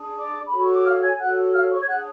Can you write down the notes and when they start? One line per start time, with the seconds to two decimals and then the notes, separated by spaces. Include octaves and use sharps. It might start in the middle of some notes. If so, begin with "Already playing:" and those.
Already playing: D4 G#4
0.16 D5 D6
0.45 B5
0.51 F#4 A4 C#5
0.59 C#6
0.72 D6
0.85 F5 F6
1.02 G#5 G#6
1.19 F#4 A4 C#5 F#5 F#6
1.54 F5 F6
1.71 C#5 C#6
1.82 G#6
1.88 D4 G#4 C#5 F#5 F#6